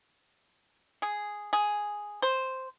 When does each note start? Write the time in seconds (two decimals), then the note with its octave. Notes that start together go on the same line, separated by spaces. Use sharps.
1.02 G#4
1.53 G#4
2.22 C5